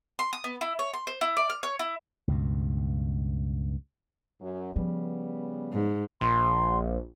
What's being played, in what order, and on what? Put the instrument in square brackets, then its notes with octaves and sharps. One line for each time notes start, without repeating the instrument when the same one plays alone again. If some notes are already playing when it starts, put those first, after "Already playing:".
[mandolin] C6
D#6
B3
E4
C#5
C6
C5
E4
D5
F6
C#5
E4
[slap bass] C#2 G2 B2
[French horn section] F#2
[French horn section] C#3 G3 B3 [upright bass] F3
[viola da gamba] G#2
[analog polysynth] A#1 [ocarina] C6